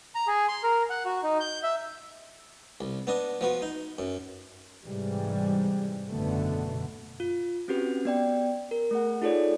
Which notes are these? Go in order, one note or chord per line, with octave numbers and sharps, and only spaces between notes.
A#5
G#4
C6
A#4
F#5
F#4
D#4
G6
E5
C2
B3 D4 D#5
F3 B3 F#4
D#4
F#2
G#2 C3 E3 G3 G#3
F#1 B2 D3 A3 B3
F4
C4 C#4 F#4 G4 B4
B3 D5 G5
A#4
A3 G#4 F#5
D#4 F4 G#4 A4 C#5 D5